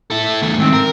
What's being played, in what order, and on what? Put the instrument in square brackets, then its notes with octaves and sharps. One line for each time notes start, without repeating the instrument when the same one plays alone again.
[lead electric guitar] E4 A4
E2 A3
[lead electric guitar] G#2 D#3 [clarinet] C4
[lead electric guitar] A#4